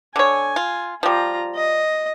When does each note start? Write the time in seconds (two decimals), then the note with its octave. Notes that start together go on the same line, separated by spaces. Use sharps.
0.16 D3 C#5 G#5
0.56 F4
1.03 F3 G3 F4 A#5
1.55 D#5